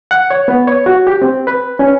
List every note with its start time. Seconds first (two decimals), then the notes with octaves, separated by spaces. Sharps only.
0.11 F#5
0.30 C#5
0.48 B3
0.67 C#5
0.86 F#4
1.07 G4
1.22 C4
1.47 B4
1.79 C#4